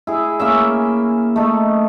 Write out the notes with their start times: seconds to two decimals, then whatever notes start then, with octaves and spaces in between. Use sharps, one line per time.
0.07 E4 G#4
0.40 A#3 C#4 E5
1.36 A3 D#4